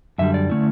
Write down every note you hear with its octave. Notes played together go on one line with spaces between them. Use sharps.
F#2 D3 G3 E5
D5
D3 A3 C#4 E4